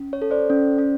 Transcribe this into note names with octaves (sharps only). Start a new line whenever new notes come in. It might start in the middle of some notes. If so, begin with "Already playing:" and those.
Already playing: C#4
C#5
A4
C5 D5
C#4
C#4